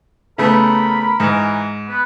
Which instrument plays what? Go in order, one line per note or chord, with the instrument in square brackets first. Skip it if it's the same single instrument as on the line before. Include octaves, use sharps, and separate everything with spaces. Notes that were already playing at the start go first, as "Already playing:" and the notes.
[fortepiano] C#3 A3 B3 [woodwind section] A#4 B5
[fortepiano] G#2 [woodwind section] E3 A#4
[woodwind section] B3 B4